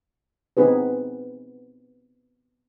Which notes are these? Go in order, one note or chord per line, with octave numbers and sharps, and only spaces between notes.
B3 C4 D#4 G#4 B4